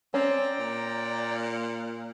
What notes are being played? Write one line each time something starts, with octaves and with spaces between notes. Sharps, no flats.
C4 C#4 D5 G5 A#5
A#2